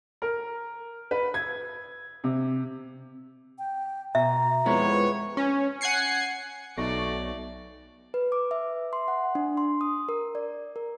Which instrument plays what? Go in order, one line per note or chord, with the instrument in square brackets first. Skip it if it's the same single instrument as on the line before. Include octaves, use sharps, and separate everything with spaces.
[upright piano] A#4
B4
G#6
C3
[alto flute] G5
[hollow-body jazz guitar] B2 [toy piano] E5 [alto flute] A#5
[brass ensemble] F2 B4 C#5 [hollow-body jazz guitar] G#3 B3 E4
[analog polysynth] C#4
F#5 G#5 G#6 C7 C#7
[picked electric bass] B1 B2 [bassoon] A3 [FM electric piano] D#4 C#6 A#6 [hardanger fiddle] D5
[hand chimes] B4
D6
E5
C6
F#5
D4
C6
D#6
A#4
D5
A#4